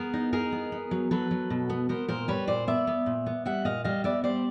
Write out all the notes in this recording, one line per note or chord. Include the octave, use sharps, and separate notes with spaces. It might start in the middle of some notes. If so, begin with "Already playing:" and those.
Already playing: B3 G#4 A#4
D#4
D#4 G#4 A#4
B3
B3
F#3
F#3 A4 B4
F#3
B2
B3
B3 A#4 C5
A#2 A#4 C5
G3 B4 C#5
A#2 C5 D5
B3 D5 E5
B3
A#2
B3
G3 E5 F#5
A#2 D#5 F5
G3 D#5 F5
B3 D5 E5
G3 C5 D5